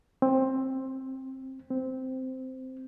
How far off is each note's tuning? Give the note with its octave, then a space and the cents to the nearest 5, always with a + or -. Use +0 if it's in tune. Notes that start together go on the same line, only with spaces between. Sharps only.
C4 +15
C4 -10